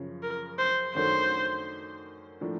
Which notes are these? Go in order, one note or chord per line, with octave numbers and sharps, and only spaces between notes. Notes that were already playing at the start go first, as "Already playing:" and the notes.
Already playing: F#2 C#3 F3
A#4
C5
F#2 D#3 F#3 A3 D4 C5
A2 F3 A#3 D4